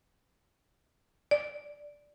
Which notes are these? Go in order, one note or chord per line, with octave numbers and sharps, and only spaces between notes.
D5